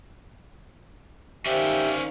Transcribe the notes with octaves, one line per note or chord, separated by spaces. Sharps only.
D#3 C#4 G4 C5 D5 E5 F5